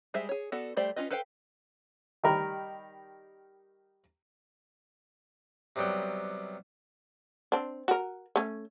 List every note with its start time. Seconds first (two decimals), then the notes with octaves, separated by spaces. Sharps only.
0.14 G3 G#3 G#4 C5 E5
0.29 G#4 C#5
0.52 B3 F#4 A4 D5
0.77 G3 A3 G4 C5 D5
0.96 C#4 E4 F4 B4 D#5
1.11 A4 B4 C5 F5 G5
2.23 D#3 G3 A#4 B5
5.76 C3 F#3 G3 B3 G5
7.52 C4 D4
7.88 F#4 A#4
8.36 A3 C#4